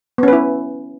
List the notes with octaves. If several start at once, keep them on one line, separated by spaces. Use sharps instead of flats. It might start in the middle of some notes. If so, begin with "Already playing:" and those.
B3 C#4 E4 B4